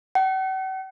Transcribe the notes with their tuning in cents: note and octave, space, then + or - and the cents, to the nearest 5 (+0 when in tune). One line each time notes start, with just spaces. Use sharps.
F#5 +45